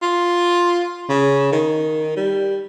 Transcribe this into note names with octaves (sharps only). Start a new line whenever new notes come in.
F4
C#3
D#3
G3